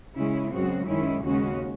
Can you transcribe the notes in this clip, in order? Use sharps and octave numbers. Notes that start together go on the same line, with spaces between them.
C#3 G#3 C#4 E4
F#2 C#3 G#3 C4 F#4
F#2 D#3 G#3 C#4 E4
D#2 C#3 G#3 C#4 F#4